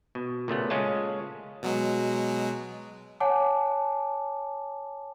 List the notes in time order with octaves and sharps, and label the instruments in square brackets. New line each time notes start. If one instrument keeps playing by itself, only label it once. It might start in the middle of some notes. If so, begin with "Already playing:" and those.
[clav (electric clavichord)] B2
A#2 C#3 A3 B3
C#3 G#3 C#4 F4 G#4 A5
[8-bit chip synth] B2 F#3 G#3
[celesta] C#5 F#5 G#5 A5 D6